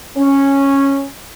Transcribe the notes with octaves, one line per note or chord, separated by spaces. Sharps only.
C#4